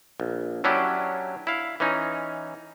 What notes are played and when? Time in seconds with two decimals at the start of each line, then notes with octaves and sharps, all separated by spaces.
0.20 A#1
0.64 F#3 C#4 D4 E4 G4
1.47 E4 F5
1.80 E3 C#4 D#4